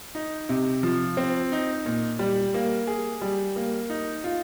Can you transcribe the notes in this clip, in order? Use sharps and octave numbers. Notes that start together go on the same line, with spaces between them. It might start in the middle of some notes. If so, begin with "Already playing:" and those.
D#4
C3
F3
C4
D#4
A#2
G3
A#3
G#4
G3
A#3
D#4
F4